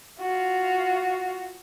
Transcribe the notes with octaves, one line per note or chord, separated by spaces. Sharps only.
F4 F#4